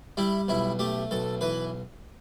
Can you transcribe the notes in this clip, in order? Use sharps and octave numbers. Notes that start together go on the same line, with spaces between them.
G3 E4
B1 E4
A3 G4
B1 A4
E3 B4